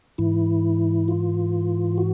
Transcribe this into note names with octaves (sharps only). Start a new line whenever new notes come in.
G#2 E3 E4
F4
F#4